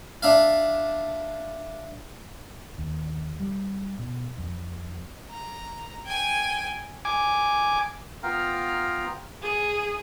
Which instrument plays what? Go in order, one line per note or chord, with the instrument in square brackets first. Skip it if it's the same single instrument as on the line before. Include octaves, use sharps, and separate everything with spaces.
[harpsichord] D4 E5 F5
[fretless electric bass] D#2
G3
B2
F2
[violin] A#5
G5 G#5
[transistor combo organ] G#5 D6
[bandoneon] B3 F4 F5 G5 A#5 F6
[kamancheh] G#4